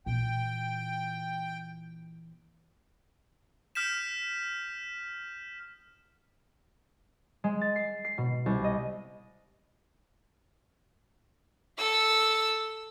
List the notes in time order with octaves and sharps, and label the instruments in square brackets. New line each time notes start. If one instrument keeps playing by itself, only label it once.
[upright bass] A#2 E3 [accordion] G5
[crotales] D#6 F6 G6 B6 E7
[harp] G#3
A6
C7
C7
B2
C2
D#5
[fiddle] A4 E6